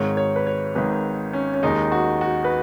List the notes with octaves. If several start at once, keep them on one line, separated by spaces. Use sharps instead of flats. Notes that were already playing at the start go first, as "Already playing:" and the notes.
Already playing: G#1 G#2 D#3 C#5
C#5
B4
C#5
G#1 G#2 D#3 B4
C#4
C#4
D#2 D#3 G#3 D#4
F#4
F#4
B4